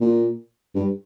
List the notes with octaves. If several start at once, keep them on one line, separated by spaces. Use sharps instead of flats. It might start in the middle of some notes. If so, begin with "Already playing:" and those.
A#2
G2